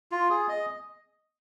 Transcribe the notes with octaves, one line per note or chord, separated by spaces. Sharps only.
F4
G#4
D#5